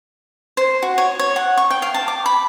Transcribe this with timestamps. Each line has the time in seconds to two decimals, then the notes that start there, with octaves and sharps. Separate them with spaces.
0.57 C5
0.82 F#4
0.98 C#5
1.19 C#5
1.36 F#5
1.58 C#6
1.70 G5
1.82 F5
1.94 A5
2.08 D6
2.26 B5